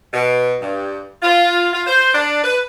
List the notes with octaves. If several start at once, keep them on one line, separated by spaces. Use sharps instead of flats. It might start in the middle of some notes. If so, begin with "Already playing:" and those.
B2
G2
F4
F4
C5
D4
B4